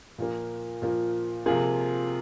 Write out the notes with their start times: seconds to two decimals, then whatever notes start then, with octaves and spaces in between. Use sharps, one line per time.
0.18 A#2 F3 A#3
0.82 A#2 F3 A#3
1.46 C3 F3 A#3 F4 G#4